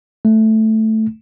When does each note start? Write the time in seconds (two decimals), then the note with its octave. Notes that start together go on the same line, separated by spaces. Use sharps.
0.25 A3